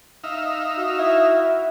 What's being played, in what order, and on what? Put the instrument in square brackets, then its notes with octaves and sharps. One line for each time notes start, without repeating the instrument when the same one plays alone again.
[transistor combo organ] D#4 E5 F5
[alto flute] F#4
[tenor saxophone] E4